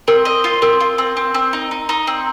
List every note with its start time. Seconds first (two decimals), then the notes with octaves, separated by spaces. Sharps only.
0.08 C4 A#4
0.25 D#5
0.44 F4
0.62 C4 A#4
0.80 F4
0.98 C4
1.17 C4
1.34 C4
1.53 D#4
1.71 D#4
1.89 D#4
2.07 C4